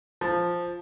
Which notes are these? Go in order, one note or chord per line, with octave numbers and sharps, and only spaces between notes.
F3